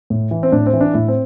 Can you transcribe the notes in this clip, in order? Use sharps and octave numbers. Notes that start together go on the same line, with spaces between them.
A2
E3
C4
A2 D4
C4
E3
D4
A2 E4
C4